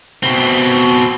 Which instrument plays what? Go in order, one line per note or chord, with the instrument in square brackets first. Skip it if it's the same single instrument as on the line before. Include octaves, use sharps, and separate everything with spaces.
[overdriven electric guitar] B2 C4